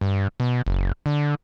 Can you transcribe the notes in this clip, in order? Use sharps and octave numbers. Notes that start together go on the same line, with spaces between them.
G2
B2
F#1
D3